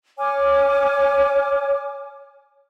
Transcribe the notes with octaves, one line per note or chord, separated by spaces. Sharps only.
C#5 G#5 D6 F6